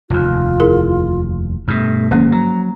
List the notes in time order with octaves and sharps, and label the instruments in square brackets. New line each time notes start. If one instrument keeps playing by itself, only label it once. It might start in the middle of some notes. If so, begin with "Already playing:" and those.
[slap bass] F1 D#2 [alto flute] F4
[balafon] E4 G#4 A#4
[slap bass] G2 B2 [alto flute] A3
[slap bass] G1 G#3 [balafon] F3 A#3 C#4
[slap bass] F#3 [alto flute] A#5